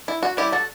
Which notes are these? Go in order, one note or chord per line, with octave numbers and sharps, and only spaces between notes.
E4
F#4
G3 C#4 E4 G4
F#4 A4